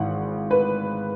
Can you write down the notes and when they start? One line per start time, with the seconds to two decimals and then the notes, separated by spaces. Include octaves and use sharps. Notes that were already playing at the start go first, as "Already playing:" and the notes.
Already playing: G#1 G#2 E3 F#5
0.51 B4